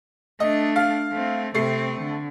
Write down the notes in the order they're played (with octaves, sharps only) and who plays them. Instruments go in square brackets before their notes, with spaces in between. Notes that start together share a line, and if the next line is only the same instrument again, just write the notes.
[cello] A3 D4 [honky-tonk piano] D#5
[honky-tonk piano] F5
[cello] A3 C4
[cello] C3 C4 [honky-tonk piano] A3 C7
[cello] D3